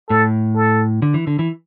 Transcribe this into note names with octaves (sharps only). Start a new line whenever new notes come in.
A2 A4
A4
D3
E3
D3
E3